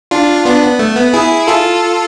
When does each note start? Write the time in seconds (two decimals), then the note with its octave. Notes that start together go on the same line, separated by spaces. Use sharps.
0.11 D4 F4
0.45 B3 D4
0.63 B3
0.79 A3
0.96 B3
1.13 E4 G#4
1.47 F4 A4